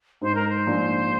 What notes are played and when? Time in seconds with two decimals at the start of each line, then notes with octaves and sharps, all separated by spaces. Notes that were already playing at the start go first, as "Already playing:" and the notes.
0.21 G#2 C5
0.35 A#4
0.48 C5
0.66 A#1